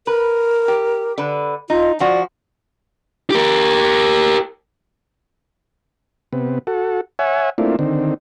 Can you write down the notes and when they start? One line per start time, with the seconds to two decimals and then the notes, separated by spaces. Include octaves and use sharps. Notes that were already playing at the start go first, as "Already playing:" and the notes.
0.07 A#4 B4
0.68 G4
1.18 D3 B4
1.70 D#4 F4
2.00 F3 F#4 D5
3.30 G4 A#4
6.33 C3 B3
6.67 F#4 A4
7.19 C#5 E5 F#5 G#5
7.58 A3 A#3 C4 D4 E4 F4
7.79 D3 D#3 C4